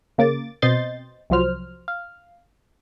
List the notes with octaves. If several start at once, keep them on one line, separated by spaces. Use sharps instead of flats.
C#3 A#3 D6 A6
B2 C4 D#5 C6 G6 A6
C2 F3 F#3 C5 F6
F5